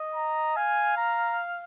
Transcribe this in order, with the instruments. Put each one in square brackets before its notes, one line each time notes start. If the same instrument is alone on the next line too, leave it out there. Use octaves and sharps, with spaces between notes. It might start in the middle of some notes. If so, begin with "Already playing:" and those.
Already playing: [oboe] D#5
[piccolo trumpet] A#5
[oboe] F5 [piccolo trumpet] G#5
[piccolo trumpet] A#5